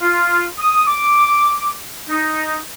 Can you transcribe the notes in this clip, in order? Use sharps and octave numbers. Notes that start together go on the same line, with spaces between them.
F4
D#6
D6
D#4